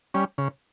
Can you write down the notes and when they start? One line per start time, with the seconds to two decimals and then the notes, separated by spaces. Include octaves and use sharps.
0.14 G3 C#4
0.38 C#3